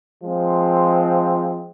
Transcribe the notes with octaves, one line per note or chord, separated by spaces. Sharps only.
F3 G#3 C4